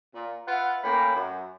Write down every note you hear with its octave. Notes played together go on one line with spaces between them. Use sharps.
A#2
F4 B4 E5 F#5
A2 A#3 C#4 G5 B5
F#2